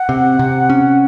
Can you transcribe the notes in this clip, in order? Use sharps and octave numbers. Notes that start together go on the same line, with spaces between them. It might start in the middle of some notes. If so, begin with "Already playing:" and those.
Already playing: F#5
C3
C3
C#4